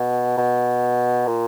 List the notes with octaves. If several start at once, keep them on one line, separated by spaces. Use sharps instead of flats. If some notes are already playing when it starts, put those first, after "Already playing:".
Already playing: B2
B2
A#2